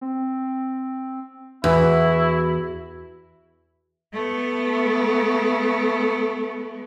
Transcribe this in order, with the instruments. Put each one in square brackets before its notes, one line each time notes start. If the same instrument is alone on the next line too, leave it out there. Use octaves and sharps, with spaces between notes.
[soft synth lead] C4
[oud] E2 [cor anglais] E4 [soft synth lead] F#4
[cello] A3 B3